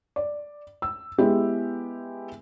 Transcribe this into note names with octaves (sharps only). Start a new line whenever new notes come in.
D5
E6
G#3 B3 E4 G4 G#4